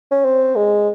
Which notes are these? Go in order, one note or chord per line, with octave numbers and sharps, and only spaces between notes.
C#4
C4
G#3